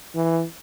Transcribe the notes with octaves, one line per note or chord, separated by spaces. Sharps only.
E3